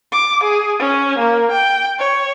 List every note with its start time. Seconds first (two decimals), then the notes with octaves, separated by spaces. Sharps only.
0.12 D6
0.44 G#4
0.79 C#4
1.19 A#3
1.52 G5
1.99 C#5